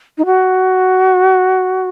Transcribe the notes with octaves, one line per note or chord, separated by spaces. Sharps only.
D#4
F#4